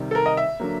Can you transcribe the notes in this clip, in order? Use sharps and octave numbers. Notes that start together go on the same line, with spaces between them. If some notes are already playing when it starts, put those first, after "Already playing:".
Already playing: C3 D#3 G3
A4
A#4
D#5
E5
D3 F#3 A#3